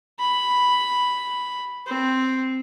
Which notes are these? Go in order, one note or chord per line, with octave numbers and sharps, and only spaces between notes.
B5
C4